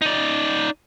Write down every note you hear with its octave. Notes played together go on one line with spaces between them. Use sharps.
D#4 D5